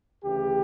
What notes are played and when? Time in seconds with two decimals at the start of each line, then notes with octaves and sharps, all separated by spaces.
0.24 D2 C#3 E3 G4